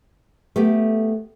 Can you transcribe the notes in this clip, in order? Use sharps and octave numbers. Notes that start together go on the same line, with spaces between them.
A3 B3 G4